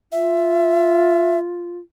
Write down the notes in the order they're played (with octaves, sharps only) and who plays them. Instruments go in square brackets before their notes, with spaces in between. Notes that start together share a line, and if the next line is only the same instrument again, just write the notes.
[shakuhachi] F4 [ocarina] E5